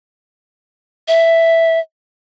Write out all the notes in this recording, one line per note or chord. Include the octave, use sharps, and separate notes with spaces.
E5